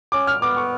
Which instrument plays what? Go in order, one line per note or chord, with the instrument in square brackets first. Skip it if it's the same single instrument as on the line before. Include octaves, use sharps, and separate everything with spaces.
[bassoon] C#4 [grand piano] D6
[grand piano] F6
[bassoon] B3 [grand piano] D6
[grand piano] C#6